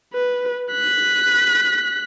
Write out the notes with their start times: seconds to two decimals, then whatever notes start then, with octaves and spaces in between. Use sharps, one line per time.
0.13 B4
0.72 F#6 B6